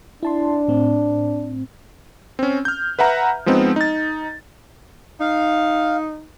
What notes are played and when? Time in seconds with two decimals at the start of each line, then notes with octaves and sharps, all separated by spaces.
0.23 D4 E4 A5 C6
0.68 A2 C4
2.39 C4 C#4
2.65 F6 G6
2.99 B4 E5 F#5 A#5
3.46 F3 G#3 B3 C4 D#4
3.76 D#4 A6
5.21 D#4 F5